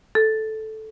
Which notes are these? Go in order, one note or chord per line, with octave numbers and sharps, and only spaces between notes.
A4